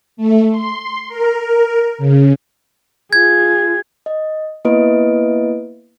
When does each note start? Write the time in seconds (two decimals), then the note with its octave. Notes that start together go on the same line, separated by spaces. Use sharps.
0.17 A3
0.51 C6
1.08 A#4
1.98 C#3
3.13 F4 G#4 G#6
4.06 D#5
4.65 A#3 B3 E4 B4 D#5 D7